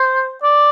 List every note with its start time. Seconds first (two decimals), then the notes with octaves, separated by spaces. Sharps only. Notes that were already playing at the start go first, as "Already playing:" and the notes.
Already playing: C5
0.43 D5